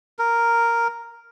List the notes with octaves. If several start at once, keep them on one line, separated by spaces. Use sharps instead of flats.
A#4